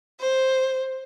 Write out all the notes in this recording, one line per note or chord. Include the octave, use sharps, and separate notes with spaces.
C5